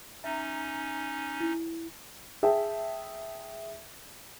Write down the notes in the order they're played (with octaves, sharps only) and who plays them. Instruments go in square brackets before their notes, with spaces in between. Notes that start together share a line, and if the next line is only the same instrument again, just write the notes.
[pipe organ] C#4 D#4 [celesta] E5 A#5
[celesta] E4
[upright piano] G#4 E5 G5 A5